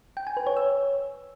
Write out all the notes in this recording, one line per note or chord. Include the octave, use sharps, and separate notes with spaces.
G5
G#5
B4
C#5
E6